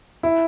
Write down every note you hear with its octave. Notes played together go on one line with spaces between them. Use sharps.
E4